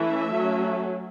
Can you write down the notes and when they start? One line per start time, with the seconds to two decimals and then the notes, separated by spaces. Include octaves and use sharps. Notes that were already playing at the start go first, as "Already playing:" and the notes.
Already playing: E3 A3 C#4 E5
0.30 F#3 A3 C#4